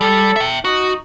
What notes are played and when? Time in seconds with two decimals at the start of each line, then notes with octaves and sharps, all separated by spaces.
0.01 G3 A4
0.36 E5 G5
0.65 D#4 F#4